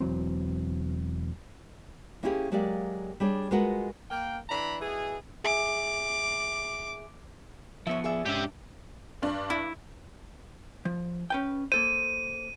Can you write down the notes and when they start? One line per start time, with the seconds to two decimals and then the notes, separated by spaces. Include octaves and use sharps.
0.01 E1 E3 F#3 C4
2.23 A#3 C#4 E4 F4 G4 G#4
2.52 F#3 G#3 A#3 G4 D5 F5
3.20 G3 D4 G#4 C#5
3.51 G#3 F4 F#4 A#4 B4 F#5
4.10 A#3 G5
4.49 E3 D4 A#5 B5
4.81 B2 E3 G#4
5.44 G#4 E5 G#5 D6
7.87 F3 B3 C#5 E5
8.04 G#4 D5 E5
8.26 G#2 C#4 D4 G4 E5
9.22 G2 D4
9.50 E4
10.85 F3
11.30 C#4 B4 G5
11.72 A#3 A4 C5 D#7